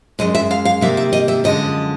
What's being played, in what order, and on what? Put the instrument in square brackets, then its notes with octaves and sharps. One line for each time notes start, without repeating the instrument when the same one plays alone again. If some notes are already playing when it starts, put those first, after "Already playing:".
[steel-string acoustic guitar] F#2 D#3 G#3 D#5
E5
F5
F5
C3 D#3 G3 A#3 E5
E5
D#5
E5
F#2 D3 F3 G#3 D#5